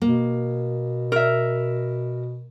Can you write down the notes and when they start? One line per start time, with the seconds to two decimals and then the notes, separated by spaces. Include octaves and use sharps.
0.02 B2 A#3
1.12 A#4 E5